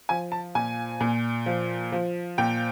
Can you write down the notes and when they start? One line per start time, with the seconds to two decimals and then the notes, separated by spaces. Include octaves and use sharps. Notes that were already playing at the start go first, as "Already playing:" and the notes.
0.09 F3 G#5
0.32 A5
0.55 A#2 G#5
1.01 A#2
1.46 F3
1.92 F3
2.38 A#2 G5